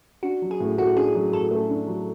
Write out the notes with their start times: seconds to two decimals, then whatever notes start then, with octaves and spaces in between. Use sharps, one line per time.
0.23 D4 F#4
0.42 F#3
0.51 G#4
0.60 A2
0.78 A3 F#4
0.96 D4 G#4
1.15 F#3
1.33 A2 A4
1.51 A3
1.69 D4
1.87 F#3